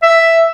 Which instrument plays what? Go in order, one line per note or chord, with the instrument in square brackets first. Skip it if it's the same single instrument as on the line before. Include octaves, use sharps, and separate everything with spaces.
[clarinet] E5